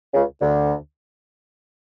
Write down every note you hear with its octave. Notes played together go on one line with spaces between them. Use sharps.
C#2 C#3
D2 D3